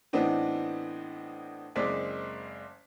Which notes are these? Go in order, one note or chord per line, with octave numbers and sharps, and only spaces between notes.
A2 E3 B3 C4 D4 D#4
F#1 G#3 C4 D5 B6